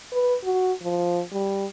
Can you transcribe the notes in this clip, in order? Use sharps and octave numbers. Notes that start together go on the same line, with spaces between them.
B4
F#4
F3
G3